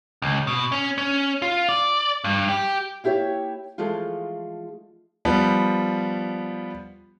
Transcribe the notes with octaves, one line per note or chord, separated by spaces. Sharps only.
C#2
B2
C#4
C#4
F4
D5
G2
G4
A#3 E4 G4 C#5 E5
E3 F3 G#3 A3 F4
F3 G3 B3